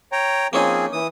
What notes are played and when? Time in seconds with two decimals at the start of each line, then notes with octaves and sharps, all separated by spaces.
0.12 C#5 G5 A#5
0.53 F3 A#3 C4 C#4 D#4 G#4
0.92 E3 D#6